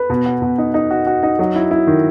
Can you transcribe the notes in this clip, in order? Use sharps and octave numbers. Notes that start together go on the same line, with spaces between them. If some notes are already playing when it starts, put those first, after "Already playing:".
Already playing: B4
B2
F#4
B2
D#4
D#4
F#4
F#4
D#4
F#3
E4
E4
D#3